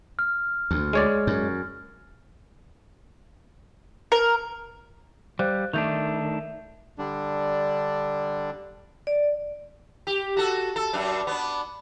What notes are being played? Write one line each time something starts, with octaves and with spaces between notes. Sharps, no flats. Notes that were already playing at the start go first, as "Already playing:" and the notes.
F6
D2
G#3 C#5 D5
F#2
A#4
G3 C5 F5 F#6
D#3 A3 D4 E5 G6 F7
D3 G3 D4
D5
G4
F#4 A4
A4
F#2 D4
B3 D4